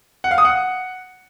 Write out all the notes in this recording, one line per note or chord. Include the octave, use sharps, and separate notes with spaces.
F#5
F5
D#6
F#5